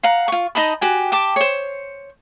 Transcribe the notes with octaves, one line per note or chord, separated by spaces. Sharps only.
F5 F#5 A#5
F4 C#6
D#4 D#5 A5 B5
F#4 G4 G#5
G4 A5 D6
C5 C#5